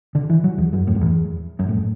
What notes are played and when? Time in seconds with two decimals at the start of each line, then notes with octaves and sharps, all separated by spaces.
0.15 D3
0.30 E3
0.44 F#3
0.58 E2
0.73 F#2
0.87 A2
0.95 F#2
1.01 E2
1.59 F#2
1.69 A2